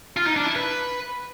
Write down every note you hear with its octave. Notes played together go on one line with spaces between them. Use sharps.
F4
D#4
D4
E4
B4